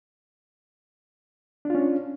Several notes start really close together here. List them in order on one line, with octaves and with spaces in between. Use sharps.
D4 F4 C#4